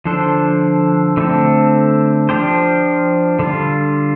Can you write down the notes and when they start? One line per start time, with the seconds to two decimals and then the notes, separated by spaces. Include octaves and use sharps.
0.05 D3 F3 D4 A4 C5
1.17 D3 A3 C4 A4
2.29 F3 D4 G4 C5
3.39 D3 G3 F4